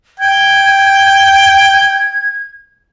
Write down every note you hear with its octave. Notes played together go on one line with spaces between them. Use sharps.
G5 G#6